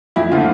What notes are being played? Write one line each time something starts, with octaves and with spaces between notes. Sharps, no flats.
F2 E4
D3 F3 A3 F4